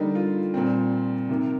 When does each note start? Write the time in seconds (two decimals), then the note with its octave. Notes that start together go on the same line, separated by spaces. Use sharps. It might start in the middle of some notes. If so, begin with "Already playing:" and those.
Already playing: D3 G3 A#3 D#4
0.15 F4
0.54 A#2 G3 C4
1.29 C3 D#3 A#3